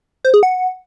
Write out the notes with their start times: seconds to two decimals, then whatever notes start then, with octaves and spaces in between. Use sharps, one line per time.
0.25 C5
0.34 G#4
0.43 F#5